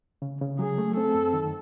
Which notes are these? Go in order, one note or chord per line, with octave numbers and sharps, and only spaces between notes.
C#3
C#3
F#3 G#4
A3
C4 A4
F#2
D#3